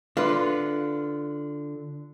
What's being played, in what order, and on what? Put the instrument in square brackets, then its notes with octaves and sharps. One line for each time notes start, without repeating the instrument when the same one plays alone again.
[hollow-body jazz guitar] D3 B4 [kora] F4